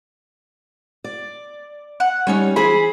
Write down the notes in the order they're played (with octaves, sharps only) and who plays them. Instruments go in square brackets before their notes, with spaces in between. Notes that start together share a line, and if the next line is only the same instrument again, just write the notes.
[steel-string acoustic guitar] D5
[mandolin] F#5
[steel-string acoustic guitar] G3 C#4 D#4 [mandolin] C#5
[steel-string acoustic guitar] E3 G#4 C5 [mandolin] G#5 B5